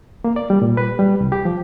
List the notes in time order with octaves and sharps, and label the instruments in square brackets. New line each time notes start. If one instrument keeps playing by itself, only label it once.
[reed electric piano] A#3
D5
G3
A#2
B4
G3
C2
G4
F3